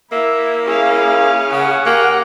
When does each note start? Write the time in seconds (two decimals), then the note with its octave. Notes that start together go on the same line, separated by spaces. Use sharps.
0.12 A#3 E4 E5
0.66 C#4 E4 G#4 F5
1.52 C#3 F#5
1.86 A#3 G4 G#5